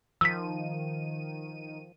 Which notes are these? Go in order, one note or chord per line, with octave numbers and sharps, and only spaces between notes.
D#3 F3 E6 B6 D#7